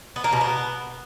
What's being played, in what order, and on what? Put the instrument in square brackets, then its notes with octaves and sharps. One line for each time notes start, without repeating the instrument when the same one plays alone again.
[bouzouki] B3
A#3
B2
B3